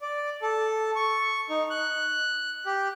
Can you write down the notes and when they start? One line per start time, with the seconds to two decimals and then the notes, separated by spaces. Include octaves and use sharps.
0.01 D5
0.42 A4
0.96 C#6
1.50 D#4
1.70 F#6
2.66 G4